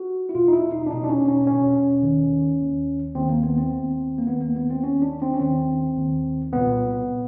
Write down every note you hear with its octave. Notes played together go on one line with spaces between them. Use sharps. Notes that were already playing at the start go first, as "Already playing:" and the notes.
Already playing: F#4
E4
E2 B2 F4
D#4
E4
D#4
D4
E2 B2 D#4
D4
C#4
C#4
E2 B2 C#4
D#2 D#3
D#2 D#3
D#2 D#3 C4
A#3
B3
C4
D#2 D#3
A#3
D#2 D#3 B3
A#3
B3
C4
D#2 D#3 C#4
D4
C4
C#4
D#2 D#3 C4
D#2 D#3
C2 A#2 B3